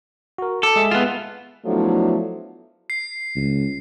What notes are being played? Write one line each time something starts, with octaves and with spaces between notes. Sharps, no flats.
F#4 A#4
A4 D6
G#3 G#4 E5
B3 F4
F3 F#3 A3 B3 D4 E4
C7
C#2